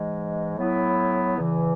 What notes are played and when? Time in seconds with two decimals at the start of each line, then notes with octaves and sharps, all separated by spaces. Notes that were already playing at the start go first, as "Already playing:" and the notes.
Already playing: G#2 E3 G#3
0.57 A2 F#3 B3 E4
1.35 E2 C#3 E3